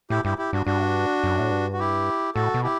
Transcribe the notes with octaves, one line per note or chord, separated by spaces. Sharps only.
A2 E4 G4
G2 E4 G4
E4 G4
G2 D4 F#4
G2 D4 F#4
F#2
A2
G2
F#4
E4 G4
A2 F#4 A4
B2
E4 G4